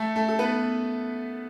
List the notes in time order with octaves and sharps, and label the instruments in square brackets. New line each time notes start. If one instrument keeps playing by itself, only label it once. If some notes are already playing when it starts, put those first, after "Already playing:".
Already playing: [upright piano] A3 A4
A3 A4
A4
B3 B4